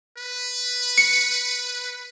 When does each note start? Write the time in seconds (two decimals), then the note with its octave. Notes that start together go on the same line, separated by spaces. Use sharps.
0.18 B4
0.98 C#7